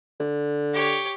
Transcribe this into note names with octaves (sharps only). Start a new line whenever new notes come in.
D3
G4 C#5